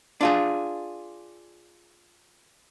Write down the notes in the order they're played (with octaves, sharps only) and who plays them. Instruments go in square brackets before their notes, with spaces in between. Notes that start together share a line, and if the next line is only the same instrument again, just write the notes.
[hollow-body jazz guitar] D4 F4 G#4